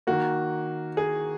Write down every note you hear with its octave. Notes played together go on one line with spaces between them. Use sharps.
D#3 A#3 F#4
G#4